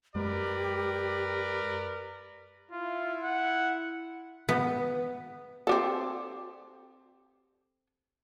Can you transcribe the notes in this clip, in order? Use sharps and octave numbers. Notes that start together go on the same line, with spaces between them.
F#2 G#3 G4 A#4 B4 D5
E4 F4
F#5
B3
C4 G4 A4